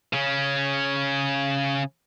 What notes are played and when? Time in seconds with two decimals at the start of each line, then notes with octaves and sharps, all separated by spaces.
0.13 C#3 C#4